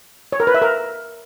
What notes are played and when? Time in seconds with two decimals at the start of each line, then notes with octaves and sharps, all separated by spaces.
0.32 C#5
0.40 A#4
0.47 B4
0.54 E5
0.62 A#4